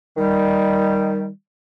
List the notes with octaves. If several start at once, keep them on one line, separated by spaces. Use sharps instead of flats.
D#3 G3